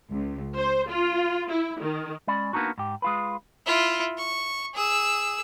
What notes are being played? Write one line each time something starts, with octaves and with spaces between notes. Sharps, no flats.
C#2
C5
F4
E4
D#3
G#3 C#4 D5 B5
A#3 B3 D4 D#4 F#4
G#2 G4
G#3 F4 B4
E4 F4
C#6
G#4 E6